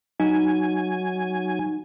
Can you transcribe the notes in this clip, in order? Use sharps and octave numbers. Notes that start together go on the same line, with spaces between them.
F#3 D#4 G#5